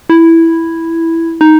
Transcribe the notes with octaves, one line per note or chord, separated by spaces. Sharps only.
E4
D#4